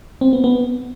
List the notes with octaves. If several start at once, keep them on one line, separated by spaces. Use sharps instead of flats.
C4
B3
B3